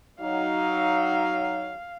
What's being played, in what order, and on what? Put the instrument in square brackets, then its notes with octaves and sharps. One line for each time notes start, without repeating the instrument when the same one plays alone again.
[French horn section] F#3 D#4 [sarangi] F5